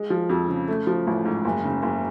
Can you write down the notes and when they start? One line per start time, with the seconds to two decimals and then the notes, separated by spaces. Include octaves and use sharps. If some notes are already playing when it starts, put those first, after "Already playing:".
Already playing: G#3
0.10 F3
0.29 F2
0.49 C#3
0.68 A3
0.87 F3
1.07 A1
1.25 G#2
1.45 F#1
1.64 C#3
1.83 F#1